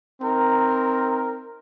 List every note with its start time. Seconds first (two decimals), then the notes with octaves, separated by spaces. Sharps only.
0.21 C4 D#4 A#4